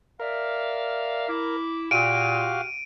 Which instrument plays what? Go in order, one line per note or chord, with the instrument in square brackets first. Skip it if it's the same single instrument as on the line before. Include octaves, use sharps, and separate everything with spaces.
[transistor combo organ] A#4 [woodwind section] D5 E5 F5
[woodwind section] E4 D6
[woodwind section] A#2 [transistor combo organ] F#4 G4 F5 [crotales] D7 D#7